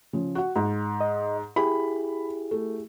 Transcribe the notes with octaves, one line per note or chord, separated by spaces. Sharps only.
C#3 F3
F#4 F#5
G#2
D#5
E4 G4 G#4 B5
A3